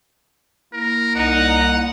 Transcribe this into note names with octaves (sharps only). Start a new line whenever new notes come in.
A#3 E4 A#4
C2 D#4 F#5